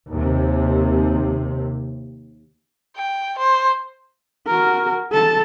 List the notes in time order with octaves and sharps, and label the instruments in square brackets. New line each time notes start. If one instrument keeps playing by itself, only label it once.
[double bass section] D#2 C3
[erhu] G5
C5
[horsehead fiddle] F#4 A#4
A4 A5